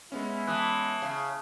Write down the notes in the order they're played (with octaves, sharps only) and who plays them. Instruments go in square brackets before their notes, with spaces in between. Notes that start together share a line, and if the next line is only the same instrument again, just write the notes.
[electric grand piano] G#3 B3 C#4 [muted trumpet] E4
[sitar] E3 [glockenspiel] A5 D#6 F#6
[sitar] C#3